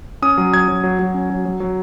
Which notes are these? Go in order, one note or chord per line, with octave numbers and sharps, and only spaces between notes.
C#4 D#6
F#3
F#3 G#6
F#3
F#3
F#3
C#4
F#3
F#3
F#3